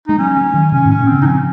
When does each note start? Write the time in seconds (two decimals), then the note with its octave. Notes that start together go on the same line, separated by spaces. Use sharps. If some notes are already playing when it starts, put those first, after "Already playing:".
0.08 G#3 D#4
0.18 F#3 C#4
0.37 F#3
0.54 D#3
0.72 C3 C#4
0.85 G#2
0.90 C#4
0.99 A#2
1.08 C#3 C4
1.22 D#4
1.25 F3 C#4